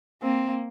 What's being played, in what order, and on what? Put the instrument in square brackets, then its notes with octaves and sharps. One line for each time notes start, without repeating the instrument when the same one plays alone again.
[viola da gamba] A#3 [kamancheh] C4